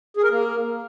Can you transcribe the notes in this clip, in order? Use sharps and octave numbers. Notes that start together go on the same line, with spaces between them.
G#4
A#4
A#3